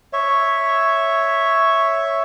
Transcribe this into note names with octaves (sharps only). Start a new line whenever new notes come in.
C#5 E5